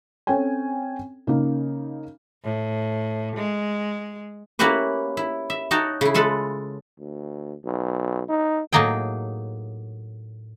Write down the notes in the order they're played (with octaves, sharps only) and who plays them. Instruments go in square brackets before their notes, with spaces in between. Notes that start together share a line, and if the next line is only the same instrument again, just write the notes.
[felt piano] C4 C#4 A4 C#5 G5 G#5
C#3 A#3 D#4
[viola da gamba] A2
G#3
[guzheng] A#3 C#4 E4 F#4 G4 B4
E4
E5
D#4 F#4 C#5 G5 A5 A#5
C#3 E4
G#3 F4 A4 B4
[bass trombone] D2
B1
D#4
[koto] A2 F#3 A#3 D#4 G#4 G5